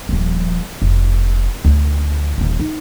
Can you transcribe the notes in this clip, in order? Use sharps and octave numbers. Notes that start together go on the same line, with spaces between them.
D#1 F3
F1
D2
D#1 E3
D#4